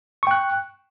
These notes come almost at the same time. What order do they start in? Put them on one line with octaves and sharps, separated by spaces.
C#6 G5 F#6